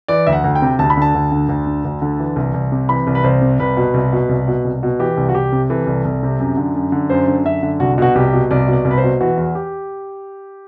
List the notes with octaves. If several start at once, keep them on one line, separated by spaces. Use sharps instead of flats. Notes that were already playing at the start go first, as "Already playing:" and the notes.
E3 D5
D2 E5
F#5
D2
G5
C3
D2 A5
B5
D3 A5
D2
D3
D2
D3
D2
D3
E3
C2
C2
C3
E3 B5
C2
B4
C2 C5
C3
C2 B4
B2
C2
B2
C2
B2
C2
B2
E3 G4
C2
F#4
C2 G4
C3
E3 A4
C2
C2
C3
F#2
D3
F#2
D3
F#2 C5
D3
F#2 E5
D3
C2 F#4
B2 F#4
C2 G4
B2
C2 D5
B2
D5
C2
B4
C5
B2
E3 F#4
E2
G4